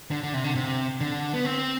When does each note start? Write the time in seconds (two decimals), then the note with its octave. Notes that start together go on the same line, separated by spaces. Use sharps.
0.11 D3
0.23 D3
0.34 C3
0.44 D3
0.55 C3
1.01 D3
1.34 B3
1.45 C4